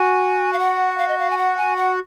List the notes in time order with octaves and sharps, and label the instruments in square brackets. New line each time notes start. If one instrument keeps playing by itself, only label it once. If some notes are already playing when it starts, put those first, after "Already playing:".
Already playing: [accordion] F#4 [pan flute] G#5
[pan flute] F5
F#5
F5
D#5
F5
G#5
F#5
G#5
F#5